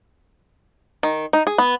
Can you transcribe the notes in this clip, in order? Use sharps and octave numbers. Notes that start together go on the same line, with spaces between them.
D#3
D#4
G#4
B3